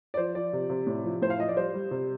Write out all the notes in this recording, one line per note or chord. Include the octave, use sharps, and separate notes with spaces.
D5
F3 C5
F3 D5
C3
C3
A2
F3
A2 C5
F5
F3 D#5
D5
G3 C5
G3
C3